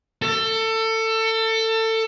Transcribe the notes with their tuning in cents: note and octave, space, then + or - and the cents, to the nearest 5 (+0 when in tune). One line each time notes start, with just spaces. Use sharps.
A4 +25